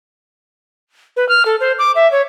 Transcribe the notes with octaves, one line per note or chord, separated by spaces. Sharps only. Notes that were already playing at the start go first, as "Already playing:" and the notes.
B4
F6
A4
C5
D6
E5
C#5